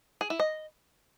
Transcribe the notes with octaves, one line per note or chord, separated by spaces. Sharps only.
G#4
E4
D#5